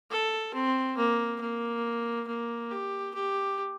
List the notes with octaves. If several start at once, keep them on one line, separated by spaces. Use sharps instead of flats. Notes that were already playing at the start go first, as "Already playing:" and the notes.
A4
C4
A#3
A#3
A#3
G4
G4